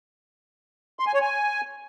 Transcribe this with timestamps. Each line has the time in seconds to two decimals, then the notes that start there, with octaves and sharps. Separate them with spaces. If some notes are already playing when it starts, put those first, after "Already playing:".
0.99 C6
1.07 G#5
1.14 C#5
1.21 G#5